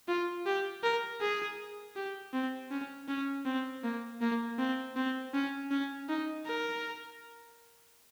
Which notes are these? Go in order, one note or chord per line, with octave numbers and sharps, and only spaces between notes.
F4
G4
A#4
G#4
G4
C4
C#4
C#4
C4
A#3
A#3
C4
C4
C#4
C#4
D#4
A#4